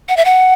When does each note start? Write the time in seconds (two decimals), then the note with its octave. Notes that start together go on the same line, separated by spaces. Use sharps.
0.09 F#5
0.17 E5
0.25 F#5